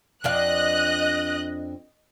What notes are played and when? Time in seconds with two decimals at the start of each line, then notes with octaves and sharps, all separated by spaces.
0.24 F2 D4 D#5 F5 F#6